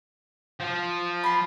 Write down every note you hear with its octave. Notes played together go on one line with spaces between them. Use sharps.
F3
B5 C6